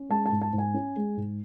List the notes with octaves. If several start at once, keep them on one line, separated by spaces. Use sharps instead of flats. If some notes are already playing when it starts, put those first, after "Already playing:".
Already playing: C#4
G#3 A5
A5
G#2
A5
G#2
G#5
C#4
G#3
G#2